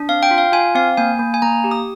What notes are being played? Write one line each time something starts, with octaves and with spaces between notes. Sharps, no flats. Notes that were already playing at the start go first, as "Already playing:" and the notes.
Already playing: D4
C4 F5
G5
F4
F5
F4 G#5
C4 F5
A#3 G#5
A#3
G#5
A#3 A#5
G4
D#6